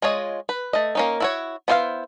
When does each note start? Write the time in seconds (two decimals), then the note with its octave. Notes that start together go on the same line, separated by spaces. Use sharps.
0.02 G#3 F4 C#5 D#5
0.49 B4
0.73 A3 D#5
0.95 A#3 C#4 D#4
1.20 E4 F#4 C#5
1.68 B3 E4 C5 C#5 F5